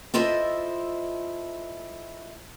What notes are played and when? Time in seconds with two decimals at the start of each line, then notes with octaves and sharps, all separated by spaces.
0.14 E4 F4 A4 C5 D#5 E5